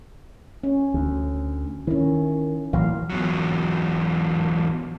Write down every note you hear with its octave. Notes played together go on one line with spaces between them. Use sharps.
C#4
D2
D#3 C#4 E4
A1 E3 F#3 A#3 F5
E2 F#3